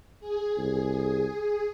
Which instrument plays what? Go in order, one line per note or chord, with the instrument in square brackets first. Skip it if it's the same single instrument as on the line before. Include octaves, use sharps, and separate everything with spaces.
[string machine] G#4
[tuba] C2